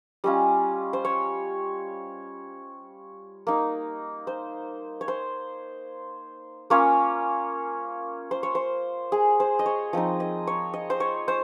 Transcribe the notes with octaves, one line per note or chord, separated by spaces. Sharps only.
G3 C#4 F4 D#5
C5
C#5
A#3 D#4
C5
C#5
C5
A#3 C#4 F4 C#5
C5
C#5
C5
G#4
C5
D#5
C#5
F3 C4 D#4 D#5
D#5
C#5
D#5
C5
C#5
C5